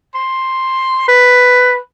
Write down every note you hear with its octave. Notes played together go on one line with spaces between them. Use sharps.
C6
B4